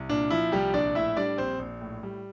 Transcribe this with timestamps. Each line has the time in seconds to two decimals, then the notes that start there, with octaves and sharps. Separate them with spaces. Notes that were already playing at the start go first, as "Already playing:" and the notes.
Already playing: C2
0.09 A#2 D4
0.30 F3 E4
0.52 C2 G3 G4
0.73 A#1 D4 D5
0.95 A2 E4 E5
1.17 G3 D4 D5
1.38 A#1 C4 C5
1.59 A#1
1.81 A2
2.03 G3